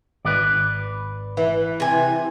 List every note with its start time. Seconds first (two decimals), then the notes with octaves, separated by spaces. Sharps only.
0.25 G#1 B4 D5
1.37 E3
1.80 C3 G#5